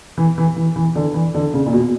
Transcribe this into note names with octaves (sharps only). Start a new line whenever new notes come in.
E3
E3
E3
E3
D3
E3
D3
C#3
A#2
B2